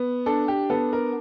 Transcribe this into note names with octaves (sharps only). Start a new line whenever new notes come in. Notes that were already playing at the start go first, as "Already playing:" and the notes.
Already playing: B3
D4 A4
G4
B3 A4
A#4